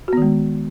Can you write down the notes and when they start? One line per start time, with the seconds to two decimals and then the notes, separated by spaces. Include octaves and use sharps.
0.08 F#4
0.13 B3
0.17 D#3
0.22 G#3